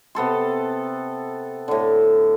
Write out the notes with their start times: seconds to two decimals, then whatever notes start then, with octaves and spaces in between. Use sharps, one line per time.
0.15 C3 B3 A4 C6
1.68 A2 D3